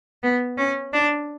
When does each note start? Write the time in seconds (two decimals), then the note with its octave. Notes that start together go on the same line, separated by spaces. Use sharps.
0.23 B3
0.58 C#4
0.93 D4